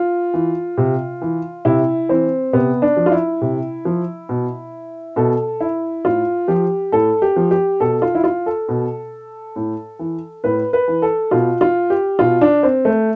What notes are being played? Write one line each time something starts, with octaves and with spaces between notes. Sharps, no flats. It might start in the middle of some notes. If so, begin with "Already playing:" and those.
Already playing: F4
E3
C3
E3
C3 E4
E3 C4
C3 B3
D4
F3
F4
E4
C3
F3
B2
B2 A4
E4
A2 F4
F3 G4
A2 A4
G4
F3
G4
B2 A4
F4
E4
F4
A4
B2
A2
E3
A2 B4
B4
E3
A4
B2 F4
F4
G4
B2 F4
D4
C4
A3